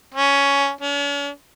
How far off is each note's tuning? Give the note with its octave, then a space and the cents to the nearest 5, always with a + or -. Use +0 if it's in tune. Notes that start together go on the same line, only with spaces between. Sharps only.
C#4 +10
C#4 +45